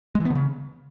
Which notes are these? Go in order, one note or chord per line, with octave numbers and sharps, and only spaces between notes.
G#3
E3
B3
D3
C#3